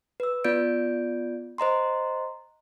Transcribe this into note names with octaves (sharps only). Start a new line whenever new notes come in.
B4 E6
B3 F4 D5 G6 D7
C5 D#5 A#5 C6